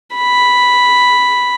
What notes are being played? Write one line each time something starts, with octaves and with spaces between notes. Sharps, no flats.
B5